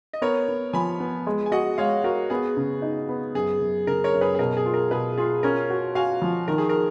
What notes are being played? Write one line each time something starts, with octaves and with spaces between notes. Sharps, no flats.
D#5
B3 A#4 C#5
B3
F3 G#5 B5
B3
G#3
G#5
F#4 D#5 F#5
G#3 C#5 F5
F#4 A#4
B3 G#4
C#3
D#4
B3
F#2 G#4
F#2
C#3 A#4
A#4 C#5
F#2
G#4 B4
G#4
B2 A#4
G#4
F4
A#4
B2 G#4 B4
F4 G#4
C#4 A#4
F#4
F#4 F5 G#5
F3
D#3 A#4
G#4
A#4